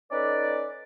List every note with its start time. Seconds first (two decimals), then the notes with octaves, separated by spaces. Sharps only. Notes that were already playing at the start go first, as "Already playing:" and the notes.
0.11 C#4 D#4 A4 B4 D5